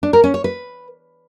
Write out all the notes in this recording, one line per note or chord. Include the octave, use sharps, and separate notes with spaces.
D4
A#4
C#4
C#5
B4